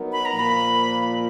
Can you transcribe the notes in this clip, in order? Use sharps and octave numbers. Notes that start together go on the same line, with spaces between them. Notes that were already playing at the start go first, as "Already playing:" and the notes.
Already playing: F#3 B3 D#4 F#4 A#4
B5
A#5
A#2 F3 A#3
B5